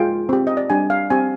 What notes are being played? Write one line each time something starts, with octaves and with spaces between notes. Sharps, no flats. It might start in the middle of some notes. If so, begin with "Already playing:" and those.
Already playing: G#3 F4 G5
C4 G4
D#5
D5
G3 D4 G4 G#5
F5
C4 G4 G#5